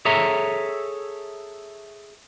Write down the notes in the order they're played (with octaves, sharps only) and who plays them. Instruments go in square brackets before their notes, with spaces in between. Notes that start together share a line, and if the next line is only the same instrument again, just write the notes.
[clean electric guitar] G#4 A4 C#5 E5 A#5